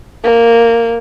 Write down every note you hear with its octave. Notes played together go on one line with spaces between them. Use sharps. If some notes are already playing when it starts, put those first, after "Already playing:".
A#3